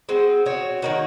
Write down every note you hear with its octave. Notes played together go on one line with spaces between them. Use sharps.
G#3 C4 F#4
C4 F#4 C#5
D#3 A#3 D#4 F#4